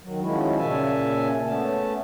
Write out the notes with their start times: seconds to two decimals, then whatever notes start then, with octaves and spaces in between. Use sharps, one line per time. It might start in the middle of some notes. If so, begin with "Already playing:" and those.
0.03 D#3 F#3
0.21 D#3 F3 G#3 C#4 E4 F#4
0.58 A#2 C#3 C#4 E5 G#5 A5
1.45 A3 B3 C#4 A5